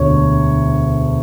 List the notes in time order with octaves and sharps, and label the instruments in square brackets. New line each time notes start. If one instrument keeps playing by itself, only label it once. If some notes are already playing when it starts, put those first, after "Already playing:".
Already playing: [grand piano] E1 D2 D3 C#5